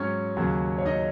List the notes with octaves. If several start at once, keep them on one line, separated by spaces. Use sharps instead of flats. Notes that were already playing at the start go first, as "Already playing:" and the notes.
Already playing: G#2 F#3 C#4 C#5
D#2 C#3 F#3
C#5
D#4 D#5